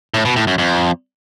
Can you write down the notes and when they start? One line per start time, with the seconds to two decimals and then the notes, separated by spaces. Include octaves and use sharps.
0.14 A2
0.25 B2
0.36 A2
0.47 F#2
0.58 F2